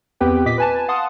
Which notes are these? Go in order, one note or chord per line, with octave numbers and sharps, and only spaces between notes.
E2 B3 C4 G4 B4 G5
A#2 D#5 D6 B6
B4 G#5 A5
F5 F#5 A5 C6 D#6